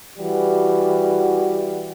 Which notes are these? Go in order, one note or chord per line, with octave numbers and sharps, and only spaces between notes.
E3 G3 F#4